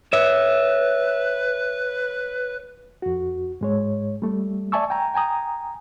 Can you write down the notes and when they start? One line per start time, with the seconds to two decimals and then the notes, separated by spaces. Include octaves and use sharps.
0.13 B4 C#5 E5
3.02 F2 F#4
3.61 G#2 G#3 C#5
4.22 G3 A3
4.72 D5 E5 G#5 A5 C#6 E6
4.90 G5 G#5 A#5
5.14 G5 G#5 A#5 D#6